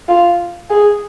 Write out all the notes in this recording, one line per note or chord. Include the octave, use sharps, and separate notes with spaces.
F4
G#4